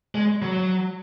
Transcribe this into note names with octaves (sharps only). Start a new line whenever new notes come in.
G#3
F#3